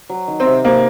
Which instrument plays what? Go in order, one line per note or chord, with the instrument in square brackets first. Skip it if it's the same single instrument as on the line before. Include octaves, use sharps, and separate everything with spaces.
[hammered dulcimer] F#3
D#3
[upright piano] C4
[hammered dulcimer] C3
[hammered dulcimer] C3 [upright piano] A#3